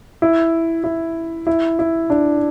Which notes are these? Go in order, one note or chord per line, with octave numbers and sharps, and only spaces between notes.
E4
E4
E4
E4
D4